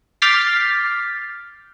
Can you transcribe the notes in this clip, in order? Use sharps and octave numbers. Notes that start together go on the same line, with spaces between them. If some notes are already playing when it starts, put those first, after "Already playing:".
D6 F6 G6 A6 B6 C7